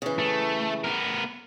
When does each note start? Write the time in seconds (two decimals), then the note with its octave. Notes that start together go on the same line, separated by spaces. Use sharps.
0.02 C#3 E3
0.18 A3
0.84 B3 A#4